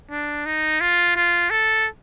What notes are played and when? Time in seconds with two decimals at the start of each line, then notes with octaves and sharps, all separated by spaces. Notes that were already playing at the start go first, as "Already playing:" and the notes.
0.11 D4
0.46 D#4
0.81 F4
1.16 F4
1.50 A4